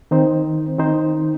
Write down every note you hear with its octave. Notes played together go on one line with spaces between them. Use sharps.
D#3 C4 D#4 C5
D#3 C4 D#4 C5